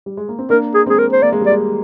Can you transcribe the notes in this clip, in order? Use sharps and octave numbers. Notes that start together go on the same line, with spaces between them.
G3
G#3
A#3
C4
A#3 D4 A#4
G#4
G#3 C4 G#4
A#4
C5
A#3 D5
G#3
G3
D5
G#3